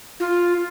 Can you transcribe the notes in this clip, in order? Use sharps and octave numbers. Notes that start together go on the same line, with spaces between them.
F4